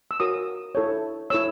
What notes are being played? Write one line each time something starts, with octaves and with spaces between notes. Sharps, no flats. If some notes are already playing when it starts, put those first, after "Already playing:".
E6
F#4 A#4 C#5 D#6
E4 A4 C#5
E4 A4 C#5 E6